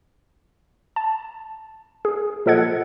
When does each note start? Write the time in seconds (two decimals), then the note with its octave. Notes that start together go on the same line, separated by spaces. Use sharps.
0.96 A5
2.05 G#4
2.46 A#2 F3 A4 D#5 F#5 G#6